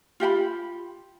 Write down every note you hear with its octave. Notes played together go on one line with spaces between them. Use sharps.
F4 G4 F#5 B5